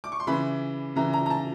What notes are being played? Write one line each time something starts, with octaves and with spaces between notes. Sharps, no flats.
D6
C#6
C6
C#3 E3 B5
C#3 E3 A#5
A#5
A#5
A5